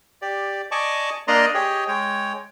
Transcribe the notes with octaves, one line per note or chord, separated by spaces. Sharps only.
G4 D5
D5 D#5 G#5 A5 C#6 D6
A#3 D4 D5 D#5 A#5 C6
G4 G#4 C#5 D#5 G5
G#3 C#5 G5